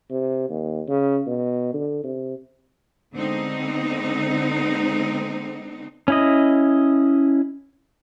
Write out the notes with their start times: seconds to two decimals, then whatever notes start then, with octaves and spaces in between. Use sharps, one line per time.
0.11 C3
0.49 D#2
0.88 C#3
1.27 B2
1.74 D3
2.04 C3
3.15 D3 G#3 B3 C4 D#4
6.08 C#4 E4 D#5